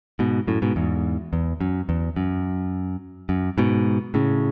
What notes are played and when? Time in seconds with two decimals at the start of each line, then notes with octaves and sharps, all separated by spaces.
0.19 G#2 B2
0.47 F#2 A2
0.62 G#2 B2
0.76 E2 G#2
1.33 E2
1.61 F#2
1.89 E2
2.16 F#2
3.29 F#2
3.58 G#2 B2
4.14 A2 C#3